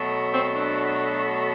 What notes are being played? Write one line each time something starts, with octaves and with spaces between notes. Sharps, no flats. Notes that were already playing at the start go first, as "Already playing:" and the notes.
Already playing: B2 F#3 A3
C4
D4